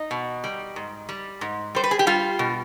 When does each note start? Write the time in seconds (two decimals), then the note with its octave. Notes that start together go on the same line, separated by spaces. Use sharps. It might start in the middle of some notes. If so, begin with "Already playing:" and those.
Already playing: D#4
0.11 B2
0.44 G3
0.76 G#2
1.09 G3
1.41 G#2
1.75 G3 C5
1.84 B4
1.91 G#4
1.99 G4
2.07 G3 F4
2.39 B2